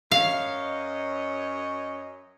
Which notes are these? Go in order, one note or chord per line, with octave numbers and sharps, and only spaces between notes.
F#2 C#5 D#5 F5